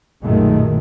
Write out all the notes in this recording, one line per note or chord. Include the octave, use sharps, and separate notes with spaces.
B1 F#2 A#2 D#3 G#3 A3